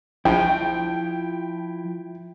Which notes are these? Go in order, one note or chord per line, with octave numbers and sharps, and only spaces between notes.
A#1 F3 E4 G5